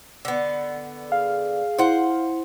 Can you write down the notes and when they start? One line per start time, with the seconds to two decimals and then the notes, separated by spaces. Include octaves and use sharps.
0.25 D3 B3
1.12 G#4 F5
1.79 E4 C5 F#5